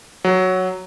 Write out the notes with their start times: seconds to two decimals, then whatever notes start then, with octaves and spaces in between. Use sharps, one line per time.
0.24 F#3